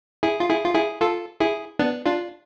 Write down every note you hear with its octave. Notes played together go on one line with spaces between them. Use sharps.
E4 G#4
F4
E4 G#4
F4
E4 G#4
F4 A4
E4 G#4
B3 D4
D4 F4